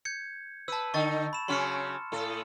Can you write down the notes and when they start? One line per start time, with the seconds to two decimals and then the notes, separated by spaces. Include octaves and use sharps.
0.05 G6 G#6 C#7
0.68 B4 A5 E6
0.94 D3 D#4 C#6 A6
1.33 B5 E7
1.48 C#3 F#3 C#4 C6 F6 C#7
2.12 A2 A4